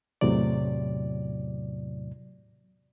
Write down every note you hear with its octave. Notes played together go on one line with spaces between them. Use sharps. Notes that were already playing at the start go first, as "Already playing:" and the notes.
E2 A2 C3 F#3 D5